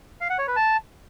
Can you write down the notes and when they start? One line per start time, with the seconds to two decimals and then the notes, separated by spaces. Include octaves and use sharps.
0.21 F5
0.30 F#5
0.39 C#5
0.47 B4
0.56 A5